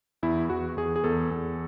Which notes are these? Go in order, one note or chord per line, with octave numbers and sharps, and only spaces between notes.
E2 E4
E2 F#4
E2 G#4
G#4
E2 A4
E2